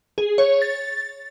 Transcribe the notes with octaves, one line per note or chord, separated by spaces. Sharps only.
G#4
C#5
A6